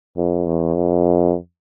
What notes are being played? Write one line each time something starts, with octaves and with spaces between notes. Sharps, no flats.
F2
E2
F2